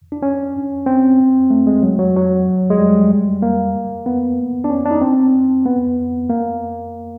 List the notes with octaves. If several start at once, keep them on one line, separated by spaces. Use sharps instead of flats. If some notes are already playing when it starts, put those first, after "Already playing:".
D4
C#4
C4
A3
G#3
F#3
F#3
F#3
G#3
G3
A#3
B3
D4
C#4
D4
D#4
C4
B3
A#3